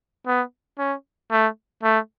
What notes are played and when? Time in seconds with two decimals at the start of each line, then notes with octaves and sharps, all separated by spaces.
0.27 B3
0.79 C#4
1.32 A3
1.83 A3